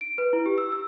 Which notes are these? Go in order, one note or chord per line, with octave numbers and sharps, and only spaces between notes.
D7
B4
E4
G4
E6
E6